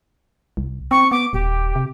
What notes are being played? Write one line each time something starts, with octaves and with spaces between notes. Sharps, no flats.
C2
C4 C#6
B3 D6
D#1 G4
C3